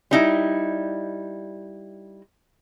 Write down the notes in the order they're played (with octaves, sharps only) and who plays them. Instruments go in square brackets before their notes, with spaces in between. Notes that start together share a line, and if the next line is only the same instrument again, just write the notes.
[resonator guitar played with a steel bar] G3 D#4 E4